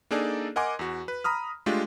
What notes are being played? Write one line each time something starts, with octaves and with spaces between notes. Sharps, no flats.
A#3 D4 D#4 G#4 A4 D5
A#4 D#5 F#5 G#5 C6 D6
E2 F#4
B4
A#5 B5 D#6 F6
G#3 A3 D4 F4 G4